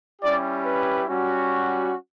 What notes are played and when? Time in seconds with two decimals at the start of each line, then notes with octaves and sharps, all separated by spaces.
0.22 G3 C#4 E4 G4 D5
0.65 B4
1.09 G3 C#4 F#4